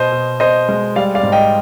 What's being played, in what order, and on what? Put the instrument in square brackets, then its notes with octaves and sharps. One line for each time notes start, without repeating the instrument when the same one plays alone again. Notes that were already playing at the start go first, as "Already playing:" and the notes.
Already playing: [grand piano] B2 C5 D#5
B2
B2 C5 D#5
G#3
G3 D5 F5
D5 F5
G#2
D#5 G5